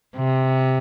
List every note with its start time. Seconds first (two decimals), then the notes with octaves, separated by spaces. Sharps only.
0.16 C3